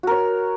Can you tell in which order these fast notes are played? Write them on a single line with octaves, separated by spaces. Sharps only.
F#4 A#4 C#5